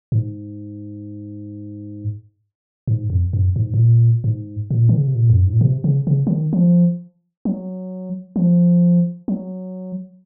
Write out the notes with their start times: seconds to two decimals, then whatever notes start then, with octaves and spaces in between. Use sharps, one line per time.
0.12 G#2
2.88 G#2
3.10 F2
3.33 F#2
3.56 G#2
3.74 G#2
3.78 A#2
4.24 G#2
4.71 A#2
4.89 D#3
4.98 C#3
5.07 C3
5.15 A#2
5.30 F2
5.37 F#2
5.47 G#2
5.53 A#2
5.61 C3
5.84 C#3
6.07 C#3
6.27 F3
6.30 D#3
6.53 F3
7.45 F#3
8.36 F3
9.28 F#3